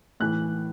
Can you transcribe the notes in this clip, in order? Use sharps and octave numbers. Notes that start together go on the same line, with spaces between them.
A2 E3 F#6